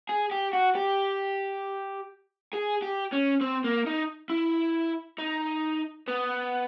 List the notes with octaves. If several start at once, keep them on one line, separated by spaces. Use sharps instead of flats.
G#4
G4
F#4
G4
G#4
G4
C#4
C4
A#3
D#4
E4
D#4
B3